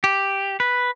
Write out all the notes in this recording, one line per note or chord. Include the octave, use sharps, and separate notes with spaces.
G4
B4